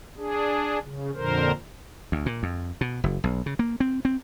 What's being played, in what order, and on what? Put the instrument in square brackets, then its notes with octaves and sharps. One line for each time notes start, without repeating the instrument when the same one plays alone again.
[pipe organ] D4 G#4
C#3
F2 A#2 D3 A#4 C5
[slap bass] D2
A#2
F2
B2
F#1
B1
C#3
A#3
C4
C4